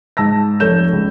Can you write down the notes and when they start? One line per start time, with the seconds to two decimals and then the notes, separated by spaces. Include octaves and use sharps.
0.17 G#2 A5 E6 A#6
0.60 F1 A4 C#5 G6 E7
0.92 C#2